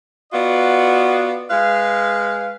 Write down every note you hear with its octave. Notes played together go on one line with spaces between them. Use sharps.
B3 F4 F#4 D5 D#5
G#3 B4 F5